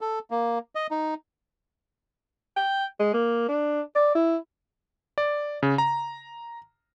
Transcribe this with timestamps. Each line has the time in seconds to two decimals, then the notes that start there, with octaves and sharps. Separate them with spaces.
0.01 A4
0.31 A#3
0.75 D#5
0.91 D#4
2.57 G5
3.00 G#3
3.14 A#3
3.49 D4
3.95 D5
4.15 E4
5.18 D5
5.63 C#3
5.78 A#5